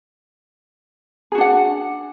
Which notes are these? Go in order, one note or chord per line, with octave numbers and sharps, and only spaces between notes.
D4 F#4 G#4 F#5